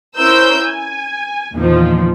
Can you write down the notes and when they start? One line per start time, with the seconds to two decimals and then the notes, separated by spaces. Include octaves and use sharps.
0.17 C#4 E4 A#4 C5 E6 G6
0.63 G#5
1.53 E2 A#2 D#3 F3